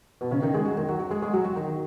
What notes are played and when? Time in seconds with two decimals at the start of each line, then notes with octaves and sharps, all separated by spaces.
0.21 B2 B3
0.31 C#3 C#4
0.42 D#3 D#4
0.54 G#3 G#4
0.65 F#3 F#4
0.77 D#3 D#4
0.89 F#3 F#4
0.99 F#3 F#4
1.11 G#3 G#4
1.22 G#3 G#4
1.33 F#3 F#4
1.44 F#3 F#4
1.55 D#3 D#4